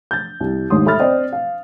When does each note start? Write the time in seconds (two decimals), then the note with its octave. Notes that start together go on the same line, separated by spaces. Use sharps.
0.11 G6 A6
0.40 C2
0.70 D#2 G#2 C#5 C6 D#6
0.86 A4 E5 B5 C6 F6 A6
0.99 C4 C5 D5 D#5 G5
1.33 F5